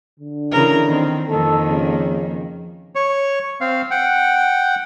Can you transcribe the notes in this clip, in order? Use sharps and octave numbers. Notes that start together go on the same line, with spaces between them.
D3
C#3 E3 A#4
D#3 C4
F2 D#3 A#3 A4
C#3
C#5
C4 F5
F#5 G5